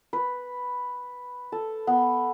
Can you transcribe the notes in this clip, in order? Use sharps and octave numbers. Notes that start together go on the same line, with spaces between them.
B4
A4
B3